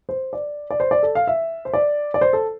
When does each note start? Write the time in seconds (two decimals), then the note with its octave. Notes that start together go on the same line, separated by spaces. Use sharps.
0.09 C5
0.33 D5
0.71 D5
0.80 C5
0.91 D5
1.03 A4
1.15 F5
1.27 E5
1.65 C5
1.74 D5
2.14 D5
2.21 C5
2.33 A4